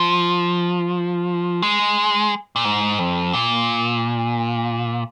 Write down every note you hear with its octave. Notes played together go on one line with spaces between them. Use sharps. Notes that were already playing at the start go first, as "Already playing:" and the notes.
Already playing: F3
G#3
A#2
G#2
F2
A#2